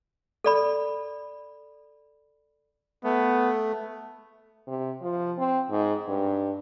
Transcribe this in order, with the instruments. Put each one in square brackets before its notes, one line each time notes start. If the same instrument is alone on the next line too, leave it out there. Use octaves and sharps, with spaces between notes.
[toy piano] A4 D5 B5
[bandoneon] A3 [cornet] B3
[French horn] C3
F3
C4
G#2
G2